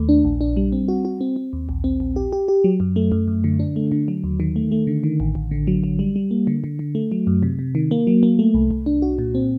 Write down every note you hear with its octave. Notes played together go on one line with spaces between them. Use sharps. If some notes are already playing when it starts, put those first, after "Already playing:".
Already playing: D#2 A3
D4
A#1
D4
G3
C4
F#4
F#4
C4
C4
D#2
A#1
C4
A#1
G4
G4
G4
F#3
F#2
A3
F#2
F#2
D3
D4
A3
D3
F#3
D#2
D#3
A3
A3
D3
D#3
A1
A1
D3
F#3
F#3
G3
G3
A#3
D3
D3
D3
A3
F#3
F#2
C3
C3
D#3
A#3
F#3
A#3
A3
C2
C2
D4
F#4
A#2
C4